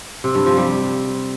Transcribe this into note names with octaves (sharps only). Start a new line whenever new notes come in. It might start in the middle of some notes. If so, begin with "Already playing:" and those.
C3
G2
F3
G3